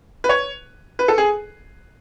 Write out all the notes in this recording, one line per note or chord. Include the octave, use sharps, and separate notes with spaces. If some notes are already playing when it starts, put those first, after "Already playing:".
B4
C#5
B4
A4
G#4